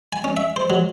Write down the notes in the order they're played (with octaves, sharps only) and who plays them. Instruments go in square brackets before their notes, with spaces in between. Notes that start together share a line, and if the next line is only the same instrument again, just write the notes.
[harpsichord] G#5
C#4
E5
C5
F#3